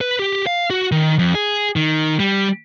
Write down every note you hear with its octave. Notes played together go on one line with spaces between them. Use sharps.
B4
G4
F5
F#4
D#3
F2
G#4
D#3
G3